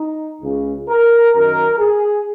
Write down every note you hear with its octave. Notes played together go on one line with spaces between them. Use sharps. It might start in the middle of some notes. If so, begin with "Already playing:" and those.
Already playing: D#4
C#2 C#3
A#4
F#2 D#3 A#4
G#4